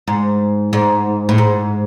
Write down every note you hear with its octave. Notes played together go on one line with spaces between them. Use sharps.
G#2
G#2
A2
G#2